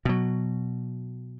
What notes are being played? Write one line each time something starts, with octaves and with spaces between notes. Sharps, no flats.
B2 F#3